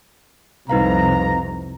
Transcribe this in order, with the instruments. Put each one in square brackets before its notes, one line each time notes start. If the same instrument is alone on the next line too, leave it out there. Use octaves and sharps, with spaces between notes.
[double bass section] C2 F2 C3 [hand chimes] D#4 B4 F5 [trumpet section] A#5